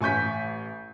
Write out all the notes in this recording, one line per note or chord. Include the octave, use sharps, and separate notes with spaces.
A1 G#5 C#6 G6 B6